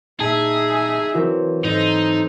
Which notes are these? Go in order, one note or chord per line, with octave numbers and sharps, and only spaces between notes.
A#2 D#4 G#4 E5 A5
E3 F#3 C4 E4 F#4 A#4
G#2 D#4 A4 C5 D#5